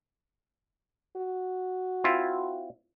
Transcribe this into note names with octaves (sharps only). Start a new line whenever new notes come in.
F#4
C4 E4 F4